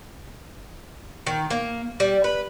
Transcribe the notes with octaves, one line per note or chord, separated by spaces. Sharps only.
D#3
A#3
G3
B4